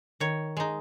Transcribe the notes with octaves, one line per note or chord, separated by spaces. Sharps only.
D#3 C#5
G#3 D#4